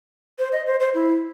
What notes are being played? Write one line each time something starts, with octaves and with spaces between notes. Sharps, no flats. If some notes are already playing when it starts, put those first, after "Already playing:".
C5
D#5
C5
C5
E4